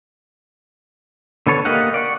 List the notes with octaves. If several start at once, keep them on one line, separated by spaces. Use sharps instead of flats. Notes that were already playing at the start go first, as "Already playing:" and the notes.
D3 B3 A4 C#5
A#3 G4 D#5 F5 F#5
D5 F#5 C#6